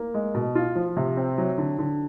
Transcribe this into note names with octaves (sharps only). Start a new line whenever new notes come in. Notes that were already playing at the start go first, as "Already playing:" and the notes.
Already playing: A#3
G#3
B2
F4
F3
C3
C4
F#3
D3
D3